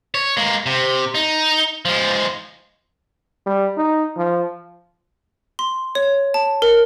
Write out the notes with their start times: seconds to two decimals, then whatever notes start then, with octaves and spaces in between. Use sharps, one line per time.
0.15 C#5
0.37 G#3 A#3
0.66 C3
1.15 D#4
1.85 F3 G#3
3.46 G3
3.77 D#4
4.17 F3
5.59 C6
5.95 C#5
6.34 A5
6.62 A#4